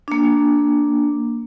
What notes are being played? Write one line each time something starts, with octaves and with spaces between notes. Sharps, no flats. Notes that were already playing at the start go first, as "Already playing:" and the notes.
A#3 D4